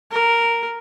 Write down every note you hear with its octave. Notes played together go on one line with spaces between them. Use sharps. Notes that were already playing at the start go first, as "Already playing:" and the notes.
A#4